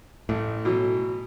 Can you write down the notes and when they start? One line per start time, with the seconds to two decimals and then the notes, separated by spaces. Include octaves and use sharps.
0.29 A1 A2
0.65 B2 E3 F#3